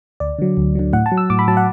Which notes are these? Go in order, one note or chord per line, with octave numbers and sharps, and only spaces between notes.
D2 D5
D3 F#3
D2
D3 F#3
A2 F#5
A5
F#3
E6
A2 D6
B5
F#3 A5
F#5